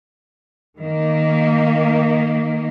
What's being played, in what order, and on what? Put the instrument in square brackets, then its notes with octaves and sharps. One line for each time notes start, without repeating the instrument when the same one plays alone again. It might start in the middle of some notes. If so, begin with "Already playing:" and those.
[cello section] D#3 A#3